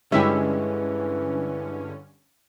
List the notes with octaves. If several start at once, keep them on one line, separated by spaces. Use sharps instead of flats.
G2 D3 E3 G#3 C#4 E4 G4 E5